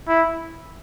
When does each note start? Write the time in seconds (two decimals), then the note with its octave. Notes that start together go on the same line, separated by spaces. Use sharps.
0.09 E4